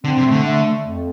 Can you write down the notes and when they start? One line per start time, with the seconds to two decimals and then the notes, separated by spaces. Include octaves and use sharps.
0.04 D3 C4
0.18 C3
0.25 A3
0.32 D3
0.44 A3
0.65 A3
0.84 F2